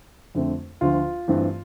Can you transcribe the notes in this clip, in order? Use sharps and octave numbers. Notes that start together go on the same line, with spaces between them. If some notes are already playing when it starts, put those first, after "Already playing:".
F2 D3 A3 C4
D2 D3 F3 F4
G2 E3 A3 C4